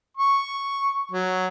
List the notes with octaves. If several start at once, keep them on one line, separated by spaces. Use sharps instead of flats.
C#6
F#3